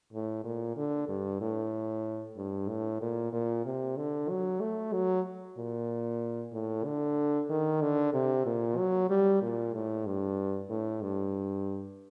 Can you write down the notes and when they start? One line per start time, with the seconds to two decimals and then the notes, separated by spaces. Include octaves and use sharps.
0.13 A2
0.44 A#2
0.77 D3
1.08 G2
1.41 A2
2.37 G2
2.69 A2
3.01 A#2
3.33 A#2
3.65 C3
3.97 D3
4.29 F#3
4.61 A3
4.93 F#3
5.58 A#2
6.53 A2
6.85 D3
7.50 D#3
7.81 D3
8.14 C3
8.46 A#2
8.78 F#3
9.10 G3
9.42 A#2
9.73 A2
10.06 G2
10.70 A2
11.02 G2